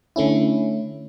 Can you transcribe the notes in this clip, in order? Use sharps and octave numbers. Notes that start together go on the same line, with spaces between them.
D3 A3 C#4 E4